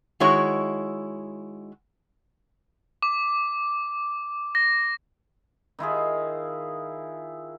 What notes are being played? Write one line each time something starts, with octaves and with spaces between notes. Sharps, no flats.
D#3 G#3 E4 F#4 C#5
D6
A#6
D#3 E4 F4 G#4